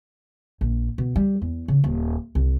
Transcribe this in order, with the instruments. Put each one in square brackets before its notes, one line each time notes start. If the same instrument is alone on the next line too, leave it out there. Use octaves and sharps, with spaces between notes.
[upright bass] A#1
B2
G3
E2
C#3
D#1
C2